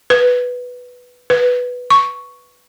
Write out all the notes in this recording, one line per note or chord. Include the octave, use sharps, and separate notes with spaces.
B4
B4
C#6